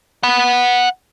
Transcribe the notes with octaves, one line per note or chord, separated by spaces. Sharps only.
F#5 B5